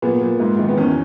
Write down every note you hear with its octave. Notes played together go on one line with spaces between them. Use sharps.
A#2 B3
A#2
G#2
D#3
B3
E2 C#4